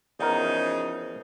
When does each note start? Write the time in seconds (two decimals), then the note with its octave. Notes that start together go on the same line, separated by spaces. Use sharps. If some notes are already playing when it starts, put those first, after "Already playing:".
0.19 E2 C#3 F3 D#4 A#4